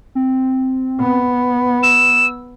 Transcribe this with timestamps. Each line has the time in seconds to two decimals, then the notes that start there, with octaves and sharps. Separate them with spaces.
0.15 C4
1.01 B3
1.83 E6 E7